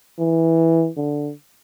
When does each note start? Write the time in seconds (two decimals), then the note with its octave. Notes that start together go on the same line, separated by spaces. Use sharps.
0.19 E3
0.97 D3